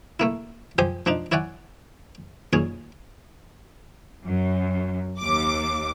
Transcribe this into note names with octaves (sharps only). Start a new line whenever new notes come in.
A3 A#3 E4
F3 G4 C5 G#5 D#6
F3 D4 D#4
E4 C#5 D5 F#5 G#5
D#2 A#2 C#4 G#4 G#5
F#2
D#2 D6